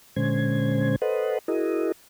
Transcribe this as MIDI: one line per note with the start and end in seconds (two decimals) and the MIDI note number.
0.16 0.96 46
0.16 0.96 50
0.16 0.96 56
0.16 0.96 61
0.16 0.96 72
0.16 0.96 92
1.02 1.38 69
1.02 1.38 71
1.02 1.38 72
1.02 1.38 75
1.02 1.38 78
1.48 1.92 64
1.48 1.92 66
1.48 1.92 68
1.48 1.92 70
1.48 1.92 75